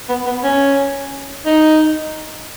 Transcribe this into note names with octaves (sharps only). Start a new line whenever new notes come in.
B3
B3
C#4
D#4